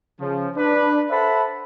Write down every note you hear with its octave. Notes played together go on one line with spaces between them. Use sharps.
C#3 F3
D4 B4
A4 C5 E5 F#5 A5 B5